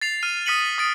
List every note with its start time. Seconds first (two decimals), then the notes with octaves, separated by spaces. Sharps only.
0.01 A6 C7 F7
0.23 F6 D#7
0.46 D#6 F6 B6 C#7 D#7 F#7
0.78 D#6 A6 D7